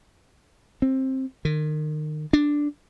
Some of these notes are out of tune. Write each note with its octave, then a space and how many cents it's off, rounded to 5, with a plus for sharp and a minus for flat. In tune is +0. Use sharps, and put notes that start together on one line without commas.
C4 +15
D#3 -30
D4 +0